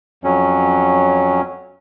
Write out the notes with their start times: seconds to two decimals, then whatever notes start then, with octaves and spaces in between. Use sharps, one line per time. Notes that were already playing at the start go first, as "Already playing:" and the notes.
0.24 F2 F#3 C#4